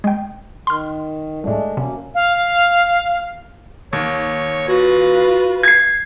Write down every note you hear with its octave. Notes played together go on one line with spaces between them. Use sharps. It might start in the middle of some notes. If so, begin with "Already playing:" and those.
G#3 G5
D#3 C6 F6
C2 A2 G#3 A3 D4
F#2 C3 A#3 C#4
F5
D#2 C#5
F4 F#4 B4
G#6 C7